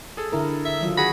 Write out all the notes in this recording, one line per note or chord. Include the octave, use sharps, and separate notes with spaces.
G#4 A4
D3 E4 A#4
E5
D#3 F#3 F4
F#4 G#4 F#5 B5 A#6